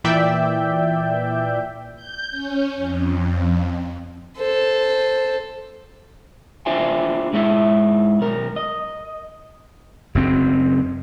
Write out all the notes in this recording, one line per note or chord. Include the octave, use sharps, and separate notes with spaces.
A#2 E3 D5 E5 G5 G6
G6
C#4
F2
A4 C5
D4 F4 G4 C5 E5 G#5
G#2 G#3 E4 E5
B1 A#4
D#5
F#1 F#2 C4